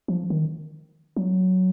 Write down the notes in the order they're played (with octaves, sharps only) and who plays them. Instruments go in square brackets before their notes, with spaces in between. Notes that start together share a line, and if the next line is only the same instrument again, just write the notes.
[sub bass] F3
D#3
F#3